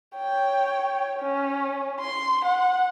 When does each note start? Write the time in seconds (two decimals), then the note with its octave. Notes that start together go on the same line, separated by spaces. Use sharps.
0.16 C#5 G5
1.20 C#4
2.01 C6
2.45 F#5